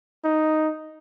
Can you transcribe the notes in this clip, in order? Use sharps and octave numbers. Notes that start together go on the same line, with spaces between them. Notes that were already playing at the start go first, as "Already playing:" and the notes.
D#4